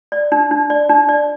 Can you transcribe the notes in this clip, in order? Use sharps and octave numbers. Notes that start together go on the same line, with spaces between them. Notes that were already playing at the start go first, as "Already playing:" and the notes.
D5
D4
D4
D5
D4
D5